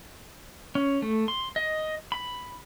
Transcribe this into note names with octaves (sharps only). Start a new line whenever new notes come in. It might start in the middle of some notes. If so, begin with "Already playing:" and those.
C#4
A3
C6
D#5
B5